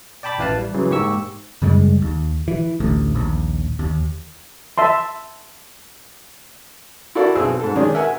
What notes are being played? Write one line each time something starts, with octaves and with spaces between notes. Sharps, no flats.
D5 G5 A5 B5 D6
A1 E4 B4 F5 A5
G3
C#3 E3 F#3
G#2 A#3 G4 C#6 E6
F#2 C#3 G3 G#3
D#2
E3
A1 D2
A#1 D#2
D#2
E5 A5 C6
E4 F#4 A4 A#4 D5 F5
B1 C4 G#4 E6
G#2 A4
D#3 G#3 C#4 D4 G#4
A#4 E5 F#5 G#5